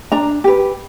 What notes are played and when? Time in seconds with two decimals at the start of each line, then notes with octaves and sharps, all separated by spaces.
0.12 D4 A#5
0.44 G4 B4